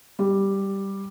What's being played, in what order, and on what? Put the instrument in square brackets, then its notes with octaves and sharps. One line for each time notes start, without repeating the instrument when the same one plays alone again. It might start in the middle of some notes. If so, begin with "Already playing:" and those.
[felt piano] G3